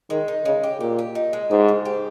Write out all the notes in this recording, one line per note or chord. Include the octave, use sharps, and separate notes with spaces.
D#3 G#3
D#4
C#3 G#3
G4
A#2 G4
G4
D#4
G#3
G#2 G4
C#3
G4